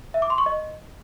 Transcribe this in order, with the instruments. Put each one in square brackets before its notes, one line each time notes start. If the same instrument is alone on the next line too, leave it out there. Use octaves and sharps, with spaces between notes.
[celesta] E5
D6
C6
C#6
D#5